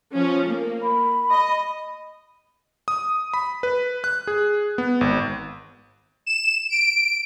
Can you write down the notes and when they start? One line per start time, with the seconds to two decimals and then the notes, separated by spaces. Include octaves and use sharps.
0.14 F3 C#4
0.47 A#3
0.83 B5
1.31 D#5
2.88 D#6
3.34 B5
3.63 B4
4.04 F#6
4.27 G#4
4.78 B3
5.01 G#1
6.26 E7
6.70 D7